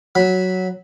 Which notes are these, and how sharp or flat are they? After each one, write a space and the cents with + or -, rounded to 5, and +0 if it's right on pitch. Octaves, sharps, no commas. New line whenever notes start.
F#3 +0 B5 +0